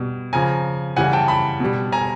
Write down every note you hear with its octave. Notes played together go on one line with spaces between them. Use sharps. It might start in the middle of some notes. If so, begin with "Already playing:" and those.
Already playing: B2 G3
C#3 F3 G#5 A#5
C#3 E3 G3 F#5 G#5
G5 A5
A5 B5
B2 G3
G#5 A#5